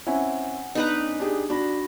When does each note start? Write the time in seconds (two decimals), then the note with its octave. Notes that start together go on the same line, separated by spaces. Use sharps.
0.07 C4 C#4 E4 F#5 G#5
0.75 B3 D4 D#4 B4 A#5
0.99 C#4
1.20 D4 G4 G#4
1.50 D4 F#4 B5 A#6